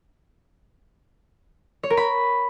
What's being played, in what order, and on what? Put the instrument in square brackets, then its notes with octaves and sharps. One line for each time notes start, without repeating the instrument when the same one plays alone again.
[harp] C#5
A#4
B5